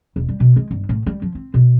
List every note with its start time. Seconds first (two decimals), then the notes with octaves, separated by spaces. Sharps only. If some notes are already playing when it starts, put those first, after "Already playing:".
0.16 E1
0.29 G3
0.40 B2
0.56 G#3
0.71 G1
0.89 A2
1.06 G3
1.22 F3
1.35 C4
1.54 B2